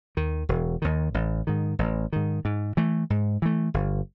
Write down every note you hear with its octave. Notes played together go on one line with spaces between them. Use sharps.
D#2 D#3
E1
D#2 D#3
A1
G#2 D#3
A1
G#2 D#3
G#2
E3 A3
G#2
E3 A3
G1